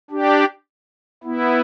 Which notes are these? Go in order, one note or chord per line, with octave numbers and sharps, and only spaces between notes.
D4 G4
B3 E4